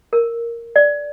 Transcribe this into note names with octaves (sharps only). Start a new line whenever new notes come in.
A#4
D5